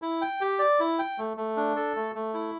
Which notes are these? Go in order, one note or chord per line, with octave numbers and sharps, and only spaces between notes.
E4
G5
G4
D5
E4
G5
A3
A3
D4
A4
A3
A3
E4